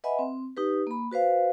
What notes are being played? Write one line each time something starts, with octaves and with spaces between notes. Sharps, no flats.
B4 D#5 E5 F#5 G#5 B5
C4
D#4 G4 B4
A#3 B5
F#4 B4 C5 F5